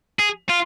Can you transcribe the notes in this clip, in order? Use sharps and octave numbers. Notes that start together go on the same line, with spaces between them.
G#4
F4